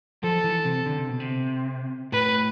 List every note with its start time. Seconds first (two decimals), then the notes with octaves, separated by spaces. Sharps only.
0.23 F3 A4
0.44 E3
0.65 C3
0.86 D3
0.98 C3
1.09 B2
1.20 C3
2.12 A2 B4